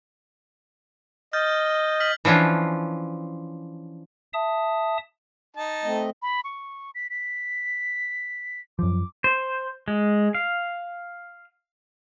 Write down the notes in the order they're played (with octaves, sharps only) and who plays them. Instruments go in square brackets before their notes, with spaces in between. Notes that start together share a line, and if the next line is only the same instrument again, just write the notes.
[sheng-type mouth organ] D#5 [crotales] F6 G6 A6
[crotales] F6 B6 F#7
[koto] E3 F3 C#4 D4 F4
[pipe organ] E5 A5 D#6
[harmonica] D#4 A5
[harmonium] A3 C4 D#5
[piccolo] B5
C#6
B6
B6
[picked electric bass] F#2 F3 [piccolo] D6
[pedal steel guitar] C5
G#3
F5